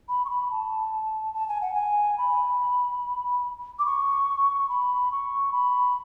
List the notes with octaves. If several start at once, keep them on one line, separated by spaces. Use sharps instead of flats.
B5
C#6
B5
A5
A5
G#5
F#5
G#5
B5
D6
C#6
B5
C#6
B5